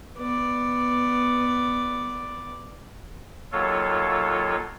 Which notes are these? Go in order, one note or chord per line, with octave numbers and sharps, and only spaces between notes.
B3 D5
D#2 F#3 F4 A4 C#5